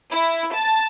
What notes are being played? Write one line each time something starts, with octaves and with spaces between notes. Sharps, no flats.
E4
A5